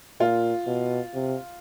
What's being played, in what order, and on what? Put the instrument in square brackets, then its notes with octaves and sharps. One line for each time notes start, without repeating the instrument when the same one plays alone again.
[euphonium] A#2 [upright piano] F4
[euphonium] B2
C3